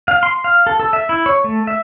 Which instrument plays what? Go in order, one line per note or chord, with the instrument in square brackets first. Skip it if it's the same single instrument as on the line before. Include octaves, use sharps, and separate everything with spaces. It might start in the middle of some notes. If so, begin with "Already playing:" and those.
[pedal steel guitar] F5
C6
F5
A4
A4
E5
E4
C#5
A3
E5